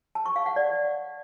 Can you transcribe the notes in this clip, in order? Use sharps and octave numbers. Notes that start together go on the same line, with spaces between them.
A5
C#6
F5
F#5
D5